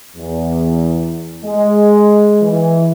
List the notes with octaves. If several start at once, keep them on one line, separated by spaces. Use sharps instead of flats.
E2
G#3
E3